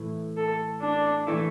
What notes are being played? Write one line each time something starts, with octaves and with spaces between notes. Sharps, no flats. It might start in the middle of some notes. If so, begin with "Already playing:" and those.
Already playing: A2 E3 A3
A4
D4
E3 A3 E4